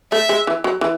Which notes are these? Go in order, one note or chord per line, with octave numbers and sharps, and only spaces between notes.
A3 E5
G#3
E3
F#3
E3